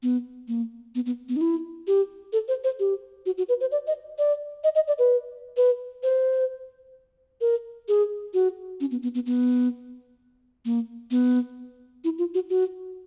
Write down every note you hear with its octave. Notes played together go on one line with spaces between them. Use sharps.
B3
A#3
B3
B3
B3
D#4
E4
G4
A4
C5
C5
G4
F#4
F#4
B4
C5
D5
D#5
D5
D#5
D#5
D5
B4
B4
C5
A#4
G#4
F#4
C#4
B3
B3
B3
B3
A#3
B3
E4
F4
F#4
F#4